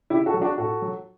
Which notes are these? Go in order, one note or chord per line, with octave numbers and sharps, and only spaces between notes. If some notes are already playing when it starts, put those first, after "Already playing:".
C#3 E4 G4
F#4 A4
F#3
D4 F#4
A2 F#4 A4
F#3